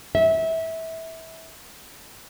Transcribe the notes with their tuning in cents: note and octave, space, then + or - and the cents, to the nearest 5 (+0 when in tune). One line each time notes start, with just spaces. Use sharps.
E5 -20